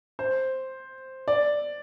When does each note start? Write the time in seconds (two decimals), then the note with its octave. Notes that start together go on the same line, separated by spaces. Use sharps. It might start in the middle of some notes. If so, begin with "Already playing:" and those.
0.19 C5
1.28 D5